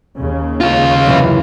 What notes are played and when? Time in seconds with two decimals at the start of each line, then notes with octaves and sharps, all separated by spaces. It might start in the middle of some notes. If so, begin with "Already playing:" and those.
0.18 D#2 C#3
0.60 C#4 F4
1.06 F#2 C3 E3